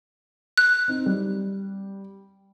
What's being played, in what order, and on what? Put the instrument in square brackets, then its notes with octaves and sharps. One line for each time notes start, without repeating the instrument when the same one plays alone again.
[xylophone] F#6
[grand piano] C4 D#4
G3